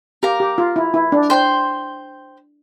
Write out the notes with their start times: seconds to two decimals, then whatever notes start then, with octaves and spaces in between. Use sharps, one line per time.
0.23 G4 A#4 F5 A#5
0.40 G4
0.58 F4
0.76 E4
0.94 E4
1.12 D4
1.30 C5 G5 C6